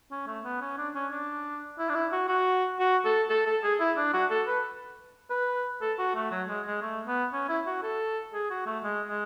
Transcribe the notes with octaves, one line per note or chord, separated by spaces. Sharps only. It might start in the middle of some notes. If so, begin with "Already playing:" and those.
C#4
A3
B3
C#4
D4
C#4
D4
E4
D4
E4
F#4
F#4
F#4
A4
A4
A4
G#4
E4
D4
F#4
A4
B4
B4
A4
F#4
A3
F#3
G#3
G#3
A3
B3
C#4
E4
F#4
A4
G#4
F#4
A3
G#3
G#3